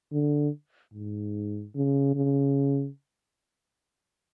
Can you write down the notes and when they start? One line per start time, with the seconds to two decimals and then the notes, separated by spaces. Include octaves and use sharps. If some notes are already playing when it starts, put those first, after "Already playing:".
0.12 D3
0.93 G#2
1.75 C#3
2.15 C#3